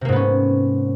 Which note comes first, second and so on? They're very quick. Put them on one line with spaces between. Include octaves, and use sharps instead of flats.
C3 A#3 G#2 B3 C#4